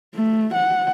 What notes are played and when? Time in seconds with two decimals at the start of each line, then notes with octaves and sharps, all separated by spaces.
0.15 A3
0.54 F#5